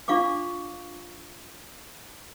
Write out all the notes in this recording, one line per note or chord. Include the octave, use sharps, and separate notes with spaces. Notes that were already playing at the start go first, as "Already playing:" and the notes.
D4 F4 F5 C#6 D6